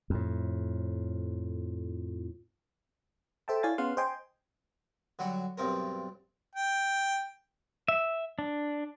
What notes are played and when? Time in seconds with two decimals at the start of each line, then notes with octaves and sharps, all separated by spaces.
0.10 F2 A2
3.48 A4 C5 E5 G5 A5
3.63 E4 C#5 D5 F5 G#5 A6
3.78 B3 C#4 G#4 F5 F#5 C6
3.97 C5 D#5 G5 G#5 C6
5.19 D3 F#3 G3 F#4
5.58 B1 G2 C4 A#4
6.55 G5
7.88 E5
8.39 D4